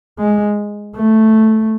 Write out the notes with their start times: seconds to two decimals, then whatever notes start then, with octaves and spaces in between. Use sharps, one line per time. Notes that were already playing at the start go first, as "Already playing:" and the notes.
0.19 G#3
0.96 A3